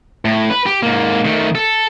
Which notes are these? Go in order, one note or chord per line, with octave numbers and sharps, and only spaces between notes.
A2
B4
G4
G#2 A#3
D#3 A3
A4